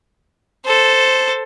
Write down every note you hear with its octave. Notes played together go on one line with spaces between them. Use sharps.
A4 C5